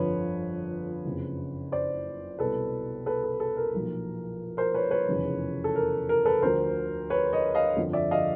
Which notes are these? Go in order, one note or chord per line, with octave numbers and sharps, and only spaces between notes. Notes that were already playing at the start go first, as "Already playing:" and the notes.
Already playing: G1 F2 D3 F3 B4 C#5
F#1 F2 C#3
C5 D5
C2 B2 A4 B4
A4 B4
A4
A4
A#4
B1 A#2 F3
A#4 C5
B4 C#5
B4 C#5
F1 E2 C#3 F3
A4
A#4
A#4
A4 B4
D2 D3 F3 A#4 C5
B4 C#5
C#5 D#5
D#5 F5
G1 F2 D3 F3
D5 E5
D#5 F5